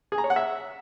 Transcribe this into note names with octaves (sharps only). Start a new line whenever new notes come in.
G#4
A#5
C#5
F#5
E5